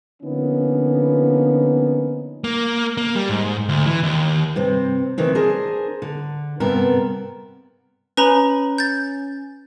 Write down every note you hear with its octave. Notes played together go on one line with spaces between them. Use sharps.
D3 F3 A#3 B3 C#4 D#4
A#3
A#3
G3
G#2
D2
E3
D#2
G2 C3 C4
D2 C3 D#3 E3 C4
D4 G#4 A#4 C5
D3
G2 C3 B3 A4 A#4
C#4 B4 A#5 B5
G6 A6